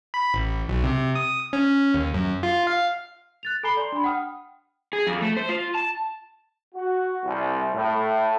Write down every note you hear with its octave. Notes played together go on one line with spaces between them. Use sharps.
B5
A1
B1
C3
D#6
C#4
D#2
F#2
F4
F5
F#6 A6 F7
A4 G#5 A#5 B5 C7 G7
D5 C6
D4 B5
F#5 G5 D#6 F6
G#4
F2
A3
C5
F4
A5
F#4
C2
A2